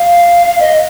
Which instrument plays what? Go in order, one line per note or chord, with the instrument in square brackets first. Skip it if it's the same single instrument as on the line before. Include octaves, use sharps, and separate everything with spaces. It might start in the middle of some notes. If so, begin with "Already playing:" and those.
Already playing: [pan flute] F5
D#5